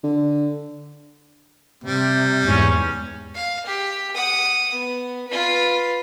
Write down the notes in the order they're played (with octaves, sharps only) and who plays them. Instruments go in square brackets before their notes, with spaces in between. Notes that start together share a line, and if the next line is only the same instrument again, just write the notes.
[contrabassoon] D3
[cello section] C3 [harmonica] G3
[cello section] E2 [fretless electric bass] G#2 [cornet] C#4
[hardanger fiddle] F5
G4
F#5 D#6
B3
F4 B4